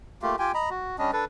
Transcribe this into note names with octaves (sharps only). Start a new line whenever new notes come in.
A3 A#3 F4 G4
F4 G4 G5 G#5
D#5 A#5 B5
F#4
G3 C#4 D4 D#5
D4 A4 B4